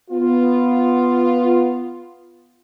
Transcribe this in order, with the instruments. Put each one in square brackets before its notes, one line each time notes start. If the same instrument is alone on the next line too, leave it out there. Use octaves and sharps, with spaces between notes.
[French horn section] B3 F4